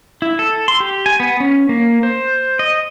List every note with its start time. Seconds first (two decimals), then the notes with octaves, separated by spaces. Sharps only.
0.22 E4
0.39 A4
0.68 C6
0.80 G4
1.06 G#5
1.20 B3
1.40 C#4
1.69 A#3
2.03 C5
2.59 D#5